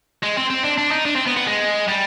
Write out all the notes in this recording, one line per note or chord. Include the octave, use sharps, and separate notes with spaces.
G#3
C4
C4
D4
D4
D#4
D4
C4
B3
B3
G#3
G3